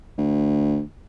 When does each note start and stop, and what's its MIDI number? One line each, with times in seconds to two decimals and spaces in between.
0.18 0.82 38